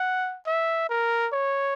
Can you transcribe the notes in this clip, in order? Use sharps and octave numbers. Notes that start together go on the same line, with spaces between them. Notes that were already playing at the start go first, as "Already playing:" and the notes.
Already playing: F#5
E5
A#4
C#5